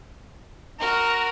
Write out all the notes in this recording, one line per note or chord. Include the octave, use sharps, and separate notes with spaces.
F#4 A#4